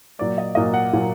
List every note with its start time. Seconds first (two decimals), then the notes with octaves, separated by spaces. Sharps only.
0.19 A#2 F#3 A#3 D5
0.38 D#5
0.55 A#2 F#3 A#3 D#5
0.74 F#5
0.93 A#2 F#3 A#3